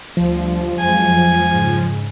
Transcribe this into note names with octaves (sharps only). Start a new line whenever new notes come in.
D2 F3 G3
F2 F#3 G#3 G#5
G#2 C#3